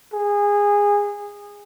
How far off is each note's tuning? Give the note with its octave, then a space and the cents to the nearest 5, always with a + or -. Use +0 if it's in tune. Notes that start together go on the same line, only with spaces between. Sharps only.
G#4 -20